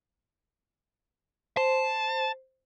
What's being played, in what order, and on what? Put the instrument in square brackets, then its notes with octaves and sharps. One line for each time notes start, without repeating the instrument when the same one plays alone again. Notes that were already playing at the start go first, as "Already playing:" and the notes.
[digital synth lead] C5 [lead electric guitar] A5